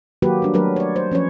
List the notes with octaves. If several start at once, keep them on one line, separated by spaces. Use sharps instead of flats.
D#3 F#3 A#3 F#4 G4 B4
G3 D4
F#3 A3 D4 A#4 B4
C#5 D5
C5
F3 C#4 B4 C#5